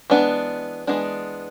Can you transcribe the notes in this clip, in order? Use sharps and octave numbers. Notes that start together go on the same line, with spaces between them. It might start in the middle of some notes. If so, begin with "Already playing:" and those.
E3 G#3 B3 D4
E3 G#3 B3 D4